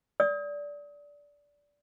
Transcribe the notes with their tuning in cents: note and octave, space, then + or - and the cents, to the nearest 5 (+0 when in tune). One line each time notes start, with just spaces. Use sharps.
D5 -15 D#6 +30